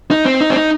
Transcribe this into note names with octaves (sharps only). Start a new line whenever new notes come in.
D#4
C4
D#4
C4
D#4